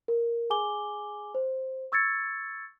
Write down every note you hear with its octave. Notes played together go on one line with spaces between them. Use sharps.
A#4
G#4 G#5 D6 G7
C5
C#6 E6 G#6 A6 C#7